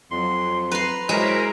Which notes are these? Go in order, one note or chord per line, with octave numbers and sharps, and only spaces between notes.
F2 F#3 C6
B4 A#5 C6
F#3 G#3 E4 A#4 C5